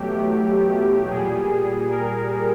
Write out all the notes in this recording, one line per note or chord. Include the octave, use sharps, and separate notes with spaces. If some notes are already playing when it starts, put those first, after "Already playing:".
Already playing: E2 B2 F#3 A3 G4
A#2 G3 G#4
G#4
A#4